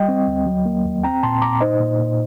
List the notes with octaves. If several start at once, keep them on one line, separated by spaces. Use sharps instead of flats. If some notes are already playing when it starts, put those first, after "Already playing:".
Already playing: G3 D#5 G5
C4
D2
F#3
A#3
D#2
C4 G5 A#5
A#2 A5 C6
A#2 A#5 D6
D#4 C5 D#5
A#2
A#2